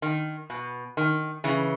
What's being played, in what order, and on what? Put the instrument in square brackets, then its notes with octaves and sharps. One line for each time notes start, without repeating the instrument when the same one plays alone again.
[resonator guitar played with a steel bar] D#3
B2
D#3
C#3 E3